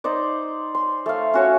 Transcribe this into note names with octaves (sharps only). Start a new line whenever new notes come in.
D#4 C5 D5
C6
A3 F5
C#4 F#4 C#5